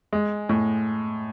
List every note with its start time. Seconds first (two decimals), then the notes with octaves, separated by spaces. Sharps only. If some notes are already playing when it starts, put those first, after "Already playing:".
0.13 G#3
0.49 A2